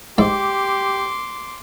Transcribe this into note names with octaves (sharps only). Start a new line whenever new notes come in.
G#2 E4 G4 C6 D6